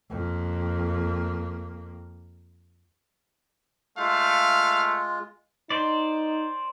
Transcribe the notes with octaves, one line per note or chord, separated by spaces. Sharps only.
F2 A#3
G#3 A3 F4 F5
D#4 C5 D5